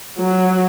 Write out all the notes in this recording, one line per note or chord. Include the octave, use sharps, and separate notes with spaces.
F#3